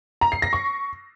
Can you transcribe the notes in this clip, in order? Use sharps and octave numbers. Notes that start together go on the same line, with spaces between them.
A#5
C7
A#6
C#6